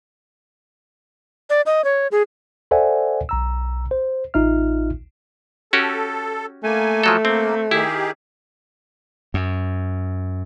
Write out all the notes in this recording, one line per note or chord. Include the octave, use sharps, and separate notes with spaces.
D5
D#5
C#5
G#4
A4 C5 D5 E5 F#5 G#5
B1 A#5 E6
C5
A1 D#4 F4 E5 F6
C#4 F#4 G4 A4
A3 A#3 G#5
F3 F#3 A4
A#3 C4
D#3 E4 G4 G#4
F#2